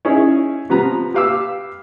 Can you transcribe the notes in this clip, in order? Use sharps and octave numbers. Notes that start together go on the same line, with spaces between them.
C#4 D#4 E4 G#4 C#5
C3 F3 B3 B4 A#5
G4 B4 F5 D6 E6